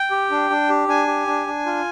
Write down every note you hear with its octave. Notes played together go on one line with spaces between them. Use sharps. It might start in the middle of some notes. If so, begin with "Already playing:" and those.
Already playing: G5
G4
D4
D4
G4
D4 G#5
G4
D4
D4
F4